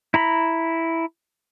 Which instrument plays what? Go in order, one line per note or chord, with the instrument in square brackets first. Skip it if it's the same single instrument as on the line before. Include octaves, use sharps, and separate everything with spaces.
[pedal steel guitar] E4 A#5 B5